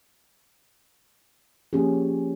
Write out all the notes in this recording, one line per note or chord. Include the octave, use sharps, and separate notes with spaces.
F3 A#3 C#4 G4 G#4